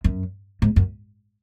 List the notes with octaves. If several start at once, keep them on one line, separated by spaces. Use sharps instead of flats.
F#2
G#2
F#2